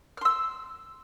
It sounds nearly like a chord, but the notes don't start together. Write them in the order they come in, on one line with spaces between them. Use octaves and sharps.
F6 C6 E6